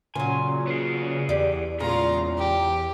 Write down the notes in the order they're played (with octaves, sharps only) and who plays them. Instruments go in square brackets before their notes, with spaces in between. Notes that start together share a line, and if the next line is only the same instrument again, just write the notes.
[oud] A#2 F#3 [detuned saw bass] C#3 [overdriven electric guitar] G#5
[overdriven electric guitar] B3 G#4
[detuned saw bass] E2 [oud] G4 D5
[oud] A#2 G#3 [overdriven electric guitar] C#3 [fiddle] F4 A#5
[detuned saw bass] E2 [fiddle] G4